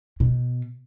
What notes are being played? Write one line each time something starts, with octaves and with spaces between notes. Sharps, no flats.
B2